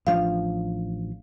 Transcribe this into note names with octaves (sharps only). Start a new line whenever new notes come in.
A1 F3 D4 F5